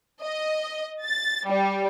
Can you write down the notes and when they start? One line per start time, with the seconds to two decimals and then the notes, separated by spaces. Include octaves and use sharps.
0.23 D#5
1.04 A6
1.47 G3